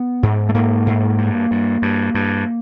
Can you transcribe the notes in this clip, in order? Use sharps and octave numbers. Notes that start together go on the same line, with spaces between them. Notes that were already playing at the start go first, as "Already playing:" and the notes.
Already playing: B3
G#2
A3
G#2 A#3
G#2
G2
G2
G2
G2